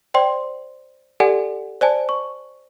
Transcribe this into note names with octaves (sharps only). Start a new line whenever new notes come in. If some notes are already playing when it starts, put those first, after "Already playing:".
C5 D5 G5 C6
G4 A4 D5 F#5 G#5
C5 D5 G#5 A5
C#6